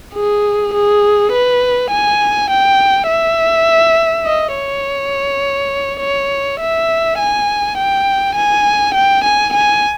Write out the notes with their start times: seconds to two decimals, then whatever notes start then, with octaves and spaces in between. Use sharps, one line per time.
0.14 G#4
0.73 G#4
1.33 B4
1.91 G#5
2.50 G5
3.08 E5
4.26 D#5
4.55 C#5
6.01 C#5
6.60 E5
7.18 G#5
7.78 G5
8.35 G#5
8.94 G5
9.24 G#5
9.53 G#5